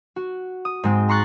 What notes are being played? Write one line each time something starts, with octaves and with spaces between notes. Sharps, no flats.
F#4
D#6
G#2 G#3 C4
A#5 C6 C#6 F#6 A6